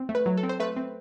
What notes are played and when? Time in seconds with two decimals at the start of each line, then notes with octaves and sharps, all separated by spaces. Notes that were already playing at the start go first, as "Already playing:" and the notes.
Already playing: C4
0.09 A3
0.15 B4
0.26 F#3
0.37 A4
0.43 C4
0.49 C5
0.60 A3 B4
0.77 C4